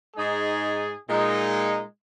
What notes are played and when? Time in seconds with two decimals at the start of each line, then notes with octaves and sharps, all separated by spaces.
0.15 G#2 G#3 D#4 G#4
1.08 A#2 G#3 D#4